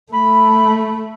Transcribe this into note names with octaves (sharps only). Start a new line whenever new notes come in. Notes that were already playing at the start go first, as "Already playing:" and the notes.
A3 B5